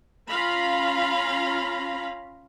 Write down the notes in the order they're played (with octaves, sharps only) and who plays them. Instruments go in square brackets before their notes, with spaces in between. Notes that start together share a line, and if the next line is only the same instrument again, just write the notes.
[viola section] C#4 F4 F5 A#5 B5